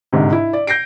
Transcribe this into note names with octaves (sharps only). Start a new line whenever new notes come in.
G1 G#2 C3
E4
D5
G6 A#6 C7 D7